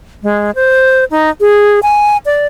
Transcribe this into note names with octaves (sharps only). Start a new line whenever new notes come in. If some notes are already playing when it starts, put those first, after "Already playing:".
G#3
C5
D#4
G#4
G#5
D5